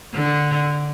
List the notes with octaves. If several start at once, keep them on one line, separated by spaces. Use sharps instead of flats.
D3